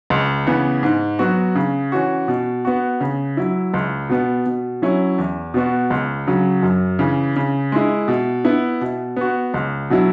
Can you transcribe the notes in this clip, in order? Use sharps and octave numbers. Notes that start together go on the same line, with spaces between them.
C#2
C#3 E3 B3
G#2
F#3 B3 F#4
C#3
E3 C#4 F#4
B2
B3 F#4
C#3
F#3 E4
C#2
B2 B3
B2
F#3 C#4 E4
E2
B2 B3 F#4
C#2
C#3 F#3
F#2
C#3 E3
C#3
G#3 E4
B2
B3 E4
B2
B3 F#4
C#2
B2 F#3 E4